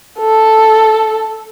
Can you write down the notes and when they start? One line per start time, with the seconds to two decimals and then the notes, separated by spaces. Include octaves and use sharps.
0.19 A4